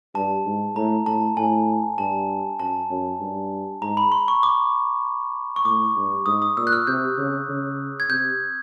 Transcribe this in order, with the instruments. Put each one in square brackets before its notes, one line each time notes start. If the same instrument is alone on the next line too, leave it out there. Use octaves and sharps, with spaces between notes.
[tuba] G2 [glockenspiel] A5
[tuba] G#2
[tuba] A2 [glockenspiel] A#5
[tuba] A2 [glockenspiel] A5
[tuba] A2 [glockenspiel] G#5
[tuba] G2 [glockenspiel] A5
[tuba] F#2 [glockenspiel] A5
[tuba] F#2
G2
[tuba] G#2 [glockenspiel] A#5
[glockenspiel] B5
C6
C#6
D6
C#6
[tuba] A2 [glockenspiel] D6
[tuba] G2
[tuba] G#2 [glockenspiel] D#6
[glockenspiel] D#6
[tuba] A#2 [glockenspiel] E6
[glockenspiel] F#6
F6
[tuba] C3 [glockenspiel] G6
[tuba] C#3
C#3
[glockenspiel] G#6
[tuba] C3 [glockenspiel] G6